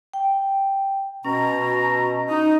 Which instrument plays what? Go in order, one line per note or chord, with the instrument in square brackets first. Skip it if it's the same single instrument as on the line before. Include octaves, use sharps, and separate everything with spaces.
[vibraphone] G5
[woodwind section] B2 A#5 [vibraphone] C#4
[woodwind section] D#4